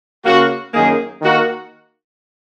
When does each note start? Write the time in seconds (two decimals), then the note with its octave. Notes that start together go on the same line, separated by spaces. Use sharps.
0.25 C#3 A#3 F#4
0.73 F#2 D#3 A#3 D#4 G#4
1.21 D#3 A#3 F#4 A#4